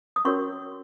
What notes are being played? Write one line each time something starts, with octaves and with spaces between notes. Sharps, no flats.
D#6
C#4 F#4 A#4 C#5 C#6